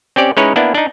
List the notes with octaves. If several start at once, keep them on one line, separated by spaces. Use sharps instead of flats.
C4 C#4 G4 D5
G#3 C#4 D#4 E4 B4 C#5
A#3 B3 D4 E4
D4 D#4